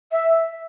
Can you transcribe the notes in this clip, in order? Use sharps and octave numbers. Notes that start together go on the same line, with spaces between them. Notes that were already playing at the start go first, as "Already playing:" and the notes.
E5